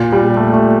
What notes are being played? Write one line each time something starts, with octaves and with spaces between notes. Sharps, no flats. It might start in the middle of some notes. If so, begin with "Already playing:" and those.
Already playing: A#2
G3
A3
A3